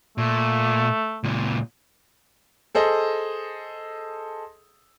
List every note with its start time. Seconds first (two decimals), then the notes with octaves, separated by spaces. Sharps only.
0.18 A#2 A3
1.23 C#2 A#2
2.75 G#4 A4 C5 D#5